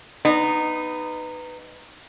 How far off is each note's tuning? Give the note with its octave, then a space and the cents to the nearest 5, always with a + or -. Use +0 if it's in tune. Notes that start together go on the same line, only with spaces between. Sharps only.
B3 +10 D#4 -15